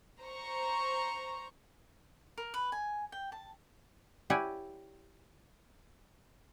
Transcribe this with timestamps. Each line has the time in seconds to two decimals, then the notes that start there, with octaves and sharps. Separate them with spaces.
0.22 C5 A#5 C#6
2.37 A#4
2.54 B4
2.72 G#5
3.12 G5
3.32 A5
4.30 E4 G4 C#5 D5 F#5 G#5